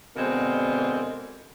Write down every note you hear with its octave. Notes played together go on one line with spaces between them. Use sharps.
B2 D3 G#3 A#3 C4